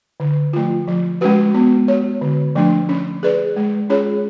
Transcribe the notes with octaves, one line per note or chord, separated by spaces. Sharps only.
D3
F3 A3 F4
F3
G#3 C#4 F#4 B4
B3
F#4 C#5
D3
F3 A3 D4
C#4
G#4 B4 D5
G#3
C#4 F4 G#4 C#5